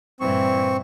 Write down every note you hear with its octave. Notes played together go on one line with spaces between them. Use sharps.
G2 A#2 E3 C4 C#6